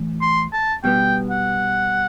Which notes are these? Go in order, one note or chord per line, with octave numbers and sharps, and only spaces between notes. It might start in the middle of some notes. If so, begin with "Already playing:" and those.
Already playing: A2 E3
C6
A5
B2 G3 B3 G5
F#5